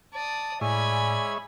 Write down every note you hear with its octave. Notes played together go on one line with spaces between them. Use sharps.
D5 A5 D#6
A2 G#3 C#5 D5 E5 G#5 B5